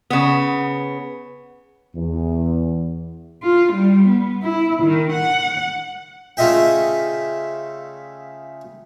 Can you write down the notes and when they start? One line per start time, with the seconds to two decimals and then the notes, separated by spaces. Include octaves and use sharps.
0.10 C#3 B3
1.96 E2
3.43 F4
3.73 G3
4.08 B3
4.43 E4
4.83 D#3
5.13 F#5
6.37 C#3 A3 F4 D#5 E5 G5